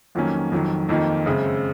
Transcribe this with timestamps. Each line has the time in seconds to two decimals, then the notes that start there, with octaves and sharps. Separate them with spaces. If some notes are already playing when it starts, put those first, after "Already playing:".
0.15 F2 D#3 F#3 A#3 C#4
0.52 F2 D#3 F#3
0.89 F2 D#3 A#3 D#4
1.26 F#2 C#3 G#3 C4